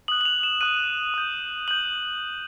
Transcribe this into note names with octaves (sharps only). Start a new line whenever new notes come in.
D#6 F#6 F#7
F#7
F7
E7
D#6 F#6 D#7
D#6 G6
D#6 G6 F#7